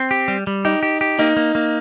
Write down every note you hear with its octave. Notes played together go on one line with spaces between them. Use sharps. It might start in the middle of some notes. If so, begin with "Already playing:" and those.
Already playing: C4
G4
G3
G3
D#4 G4
G4
G4
A#3 D#4
A#3
A#3